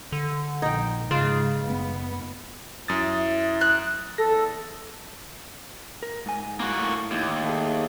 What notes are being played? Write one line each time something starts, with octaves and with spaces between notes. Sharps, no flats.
D3
A#1 D#4 G5
G#2 C#3 F4
F#1 B3
F#2 E4 D#6 A6
F#6
E2 A4 A#6
A#4
G#2 G#5
A#3 F#4
A2
D#2
A3 G#4